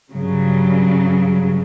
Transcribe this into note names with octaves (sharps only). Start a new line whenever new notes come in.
G2 C#3 F#3